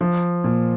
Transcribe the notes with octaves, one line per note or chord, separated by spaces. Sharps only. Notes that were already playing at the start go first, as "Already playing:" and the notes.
F3
A#2